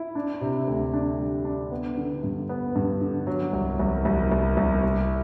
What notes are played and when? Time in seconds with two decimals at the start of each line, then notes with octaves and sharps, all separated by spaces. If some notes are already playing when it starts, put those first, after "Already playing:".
Already playing: E4
0.15 D4
0.41 C3
0.67 D2
0.93 D4
1.19 G3
1.45 D4
1.71 B3
1.97 D3
2.23 G2
2.49 B3
2.75 G2
3.01 D3
3.27 F#3
3.53 C2
3.79 C2
4.05 C2
4.31 C2
4.57 C2
4.83 C2